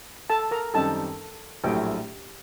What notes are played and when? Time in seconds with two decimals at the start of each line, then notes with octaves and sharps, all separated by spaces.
0.30 A4 A5
0.51 A#4 A#5
0.74 F#2 D#3 G3 C4 D#4 A4 A5
1.64 A#1 A2 F#3 A3 G4 G5